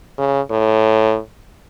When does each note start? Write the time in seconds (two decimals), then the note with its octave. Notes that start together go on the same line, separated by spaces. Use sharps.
0.18 C#3
0.50 A2